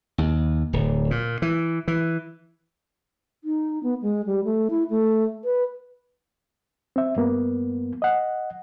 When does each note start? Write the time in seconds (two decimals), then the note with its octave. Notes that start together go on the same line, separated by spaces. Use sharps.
0.18 D#2
0.73 D1
1.11 A#2
1.42 E3
1.88 E3
3.44 D#4
3.83 B3
4.02 G#3
4.26 G3
4.44 A3
4.70 E4
4.90 A3
5.44 B4
6.96 C4 E5
7.16 G2 A#3 B3
8.02 D#5 F#5